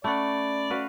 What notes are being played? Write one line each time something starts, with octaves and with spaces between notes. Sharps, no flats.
A3 C#4 D5 F#5 B5
F#4 B4 F5